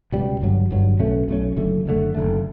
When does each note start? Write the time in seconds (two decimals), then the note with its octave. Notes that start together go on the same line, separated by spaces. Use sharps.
0.12 C#2 B2 G3
0.41 G1 G2 F#3
0.71 G1 G2 F#3
0.99 B1 B2 A3 C#4
1.28 B1 B2 A3 C#4
1.57 F#1 F#2 D3 A3
1.86 F#1 F#2 D3 A3
2.15 F#1 E2 D3 A3